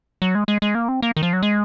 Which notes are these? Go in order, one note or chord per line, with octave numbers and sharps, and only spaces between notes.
F#3
G#3
G#3
G#3
A#3
C4
A#3
D#3
F3
F#3
G#3